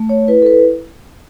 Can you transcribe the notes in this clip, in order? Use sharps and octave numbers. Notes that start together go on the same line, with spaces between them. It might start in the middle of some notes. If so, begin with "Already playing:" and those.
Already playing: A3
C#5
E4 B4
A4
B4